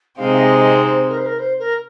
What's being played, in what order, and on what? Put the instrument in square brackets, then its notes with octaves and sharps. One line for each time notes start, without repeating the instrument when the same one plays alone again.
[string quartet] C3 G#3 C4 D#4 [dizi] F5
[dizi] F5
D#5
D#5
C5
A#4
C5
A#4
C5
A#4